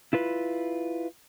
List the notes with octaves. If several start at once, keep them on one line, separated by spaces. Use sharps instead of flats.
E4 F4 B4